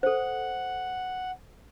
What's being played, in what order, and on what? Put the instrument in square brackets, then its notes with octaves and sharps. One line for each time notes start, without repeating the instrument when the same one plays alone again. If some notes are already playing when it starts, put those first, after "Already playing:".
[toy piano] A4 C5 [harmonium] F#5